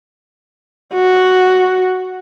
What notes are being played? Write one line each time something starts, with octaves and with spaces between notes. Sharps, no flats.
F#4